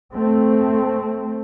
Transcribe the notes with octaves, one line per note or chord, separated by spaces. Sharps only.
A3 C4